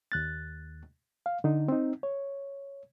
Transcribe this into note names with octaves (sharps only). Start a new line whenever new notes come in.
D#2 F#6 A6
F5
D3 D#4
C4 D#4
C#5